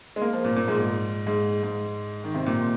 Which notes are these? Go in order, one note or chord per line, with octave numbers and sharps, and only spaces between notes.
G#3
A#3
F3
A#2
A#2
G#2
G#2
G#2
G#2
D#3
C3
A#2